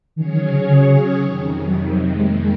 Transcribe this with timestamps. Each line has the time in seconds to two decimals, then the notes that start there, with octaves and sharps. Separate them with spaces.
0.16 D#3 F#3 C#4 G#4 C#5
0.33 D#3
0.49 C#3
0.66 C#3
1.16 F2 C3 D#3
1.66 F#3
1.90 F#3
2.15 F2 D#3 G#3 A#3
2.41 G#3